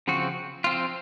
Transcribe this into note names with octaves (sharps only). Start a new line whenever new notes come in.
C#3 F3 C4 F#4
F3 C4 F4